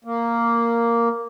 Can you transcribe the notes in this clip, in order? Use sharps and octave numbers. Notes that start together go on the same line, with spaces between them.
A#3